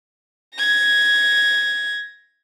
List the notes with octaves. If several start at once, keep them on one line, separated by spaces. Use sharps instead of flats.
G#6 A#6